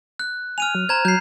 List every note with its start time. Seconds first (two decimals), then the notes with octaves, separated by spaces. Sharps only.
0.19 F#6
0.58 G#5 F6 D#7 F7
0.75 F#3
0.89 C5 A#5 G#6
1.05 F#3 G6 C7